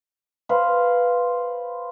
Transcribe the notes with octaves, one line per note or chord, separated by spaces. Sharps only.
B4 C5 F5